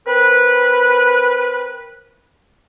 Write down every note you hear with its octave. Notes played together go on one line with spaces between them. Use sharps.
C4 A#4 B4